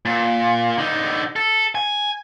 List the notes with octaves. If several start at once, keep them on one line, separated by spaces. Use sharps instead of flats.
A#2
D3 D#4
A4
G#5